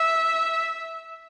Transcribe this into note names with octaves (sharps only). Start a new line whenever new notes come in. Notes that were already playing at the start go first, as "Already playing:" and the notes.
Already playing: E5